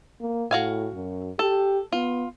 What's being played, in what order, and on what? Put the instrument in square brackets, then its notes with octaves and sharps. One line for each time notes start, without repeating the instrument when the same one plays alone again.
[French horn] A#3
[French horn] A2 [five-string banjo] F#4 F5 G#5
[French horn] F#2
[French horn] G4 [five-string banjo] A4
[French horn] B3 [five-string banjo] F4